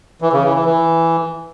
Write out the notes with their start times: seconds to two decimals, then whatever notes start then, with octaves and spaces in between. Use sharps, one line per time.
0.22 E3
0.33 C#3
0.44 E3
0.54 E3
0.65 E3